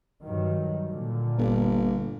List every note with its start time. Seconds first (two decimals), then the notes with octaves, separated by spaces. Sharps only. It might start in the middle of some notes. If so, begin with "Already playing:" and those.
0.24 G2 D#3 F#3
0.88 A#2 D3
1.38 G1 A#3